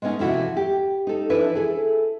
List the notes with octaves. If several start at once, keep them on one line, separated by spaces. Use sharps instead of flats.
G#3 A3 B3 C#4 D#4
F2 C3 E3 E4 F#4
G4
D#4 A4
F2 E3 D4 E4 B4
E4 G#4 A4